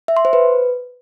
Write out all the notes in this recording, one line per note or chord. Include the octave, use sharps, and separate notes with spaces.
E5
C6
C5
B4